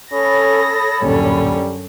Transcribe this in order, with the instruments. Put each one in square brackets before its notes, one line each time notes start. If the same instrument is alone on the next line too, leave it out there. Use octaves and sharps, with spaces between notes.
[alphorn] C#4 [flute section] A4 C#5 B5 [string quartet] D#6 A#6
[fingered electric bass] D1 A#2 [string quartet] F#2 D3 C#4 [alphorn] G3